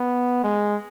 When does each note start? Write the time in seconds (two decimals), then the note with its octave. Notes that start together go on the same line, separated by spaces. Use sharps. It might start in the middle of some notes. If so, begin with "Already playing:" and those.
Already playing: B3
0.44 G#3